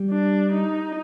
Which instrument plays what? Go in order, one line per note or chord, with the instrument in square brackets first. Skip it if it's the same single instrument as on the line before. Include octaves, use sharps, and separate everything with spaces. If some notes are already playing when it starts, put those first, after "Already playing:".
Already playing: [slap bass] G3
[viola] D4
D#4